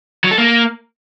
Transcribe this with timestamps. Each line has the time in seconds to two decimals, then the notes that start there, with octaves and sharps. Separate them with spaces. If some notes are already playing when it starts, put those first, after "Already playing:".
0.24 F#3
0.31 A4
0.38 A#3